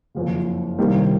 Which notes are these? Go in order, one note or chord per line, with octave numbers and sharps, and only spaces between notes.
F#1 F2 C#3
C2 C3 D#3 G3 A#3